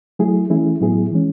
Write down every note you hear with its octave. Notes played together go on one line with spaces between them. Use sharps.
F#3 A3 E4 G#4
E3 A3 C#4 E4 G#4
A2 F#3 B3 E4 G#4
E3 G#3 C#4